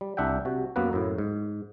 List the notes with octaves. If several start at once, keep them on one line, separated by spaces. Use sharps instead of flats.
G3
C2 D4 E5 F#5 G5
C3 F#4
F#2 A#3 B3 F#4 B4
F#2 A2
G#2